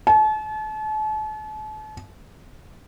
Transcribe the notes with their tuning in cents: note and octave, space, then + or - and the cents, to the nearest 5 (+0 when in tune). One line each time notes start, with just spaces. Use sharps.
A5 -40